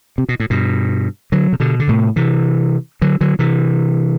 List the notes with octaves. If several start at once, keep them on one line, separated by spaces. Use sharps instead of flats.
C3
B2
A2
G2 B2
D3 F#3
C3
B2 D3
D3
A2 C3
C3 E3
D3 F#3
D3 F#3
C3 E3